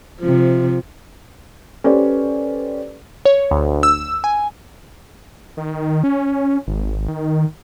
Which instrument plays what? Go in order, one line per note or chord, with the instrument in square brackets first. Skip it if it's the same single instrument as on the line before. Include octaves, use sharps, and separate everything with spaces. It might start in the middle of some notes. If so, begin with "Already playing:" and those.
[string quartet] C3 F3
[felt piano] C#4 G4 C5 [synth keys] A4 B4 D5
[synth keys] C#5
D2
E6
G#5
[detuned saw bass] D#3
C#4
G#1
D#3